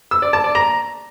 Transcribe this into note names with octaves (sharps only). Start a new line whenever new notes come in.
E6
D5
A5
D5
A#5